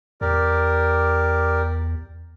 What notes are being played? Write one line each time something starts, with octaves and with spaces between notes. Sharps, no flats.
E2 G4 A#4 D5